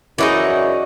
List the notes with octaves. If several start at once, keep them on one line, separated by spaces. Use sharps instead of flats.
F#2 E3 D#4 E4 F#4 G#4 D5